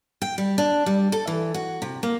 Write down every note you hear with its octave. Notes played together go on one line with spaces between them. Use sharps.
G5
G3
D4
G3
A4
E3
F#4
C3
A#3